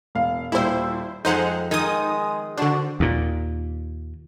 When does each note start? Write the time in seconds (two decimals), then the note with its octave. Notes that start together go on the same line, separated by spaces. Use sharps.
0.15 E1 F5
0.52 D#1 G3 E4 C5 E6
1.25 F2 G#3 D#4 C5 F#5 G#5 G6 F7
1.71 D#3 G#3 D#4 D#5 G#5 D#6
2.57 D3 D4 F#4 C5
3.00 D#2 A#2